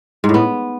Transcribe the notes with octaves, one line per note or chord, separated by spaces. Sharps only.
G#2
A2
B3